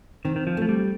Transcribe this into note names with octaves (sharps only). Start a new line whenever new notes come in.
D#3 C4
D#3
F3
F3 A3
G3